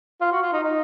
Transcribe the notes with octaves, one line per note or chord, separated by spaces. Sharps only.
F4
F#4
F4
D#4
D#4